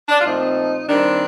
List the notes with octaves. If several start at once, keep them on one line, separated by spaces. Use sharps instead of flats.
D4
F4
A#2 F3 A3 C4 D#4
D#3 G3 C4 D4